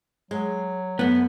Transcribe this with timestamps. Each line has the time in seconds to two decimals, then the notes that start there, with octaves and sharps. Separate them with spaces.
0.31 F#3 G#3
0.99 F#2 A3 B3